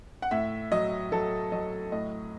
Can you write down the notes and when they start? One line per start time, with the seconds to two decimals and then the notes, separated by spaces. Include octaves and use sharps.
0.22 F#5
0.31 A2 E5
0.71 F#3 D#5
1.12 F#3 A4
1.52 F#3 D#5
1.92 A2 D#5